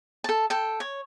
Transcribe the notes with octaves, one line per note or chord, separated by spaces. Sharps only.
A4 A5
A4 G5
C#5